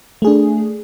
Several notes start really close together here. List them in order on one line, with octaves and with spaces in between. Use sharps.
A3 G#4 D4